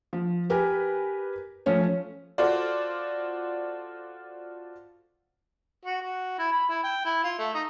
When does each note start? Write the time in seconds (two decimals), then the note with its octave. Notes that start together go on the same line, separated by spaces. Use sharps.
0.13 F3
0.50 G4 A#4 B4 G#5
1.66 F3 A3 C#4 C#5
2.38 F4 F#4 A4 C5 D5
5.85 F#4
6.02 F#4
6.39 E4
6.52 B5
6.69 E4
6.84 G5
7.05 E4
7.24 F4
7.39 A3
7.54 D#4